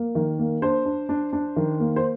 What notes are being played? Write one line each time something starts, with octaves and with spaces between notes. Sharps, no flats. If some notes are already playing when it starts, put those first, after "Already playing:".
Already playing: A#3
D#3
A#3
D4 C5
D4
D4
D4
D#3
A#3
C5